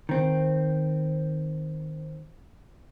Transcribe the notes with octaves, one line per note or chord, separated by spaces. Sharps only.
D#3 C4